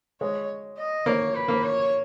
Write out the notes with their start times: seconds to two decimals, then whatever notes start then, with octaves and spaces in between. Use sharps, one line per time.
0.21 G#3 C#5
0.78 D#5
1.06 A#3 C#5
1.34 B4
1.48 A#3
1.63 C#5